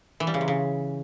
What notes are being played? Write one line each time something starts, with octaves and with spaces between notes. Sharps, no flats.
E3
G3
C#3
C3
C#3